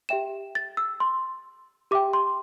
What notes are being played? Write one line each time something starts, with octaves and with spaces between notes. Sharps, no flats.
G4 E5 G5 E7
A6
E6
C6
G4 E5 G5 D6
C6